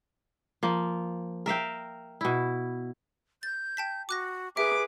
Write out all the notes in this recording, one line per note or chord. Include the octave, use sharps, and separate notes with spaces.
F3 A#3
A#4 E5 F5 G5
B2 E4
G6 A6
G5 A5 B6
F#4 D6 F#6 A#6
G#4 B4 E5 D6